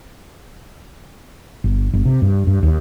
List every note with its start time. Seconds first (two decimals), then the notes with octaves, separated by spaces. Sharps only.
1.64 G1
1.93 G1
2.05 C3
2.22 G2
2.47 G2
2.63 D#2